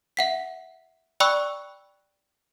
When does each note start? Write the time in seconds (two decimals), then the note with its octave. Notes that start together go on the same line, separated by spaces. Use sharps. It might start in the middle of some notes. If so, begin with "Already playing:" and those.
0.17 E5 F#5 B6
1.20 D5 G5 B5 C#6 E6 F#6